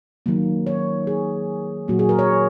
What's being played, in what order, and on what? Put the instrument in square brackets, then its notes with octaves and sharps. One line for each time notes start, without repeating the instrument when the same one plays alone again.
[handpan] D#3 F#3 A#3
C#5
G#4
A#2 F#3 A#3 F#4
G#4
A#4
C#5